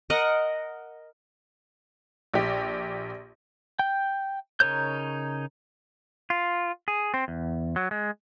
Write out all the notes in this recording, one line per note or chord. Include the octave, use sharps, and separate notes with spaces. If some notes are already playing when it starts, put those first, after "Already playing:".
A#4 D#5 F#5
A#1 G4
G5
C#3 D#4 A#4 C#5 G6
F4
G#4
C4
E2
F#3
G#3